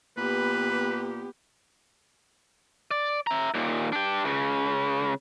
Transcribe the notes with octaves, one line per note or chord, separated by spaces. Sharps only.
A#2 B3 G4 B4
D5
E5 A#5
D#2 A#2
D4 G4
C#2 C#3